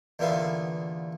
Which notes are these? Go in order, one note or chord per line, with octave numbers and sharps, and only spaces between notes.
E2 A#2 D3 B3 E5 F5